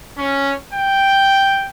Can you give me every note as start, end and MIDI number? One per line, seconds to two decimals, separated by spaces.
0.17 0.53 61
0.72 1.68 79